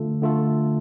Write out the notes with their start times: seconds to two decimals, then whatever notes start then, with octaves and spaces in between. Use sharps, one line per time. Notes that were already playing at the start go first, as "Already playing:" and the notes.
Already playing: D3 A3 F4 A4
0.22 D3 A3 F4 A4